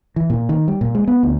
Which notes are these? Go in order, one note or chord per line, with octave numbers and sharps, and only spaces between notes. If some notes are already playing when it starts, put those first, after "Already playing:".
E3
A#2
D#3
G3
A#2
G#3
B3
D2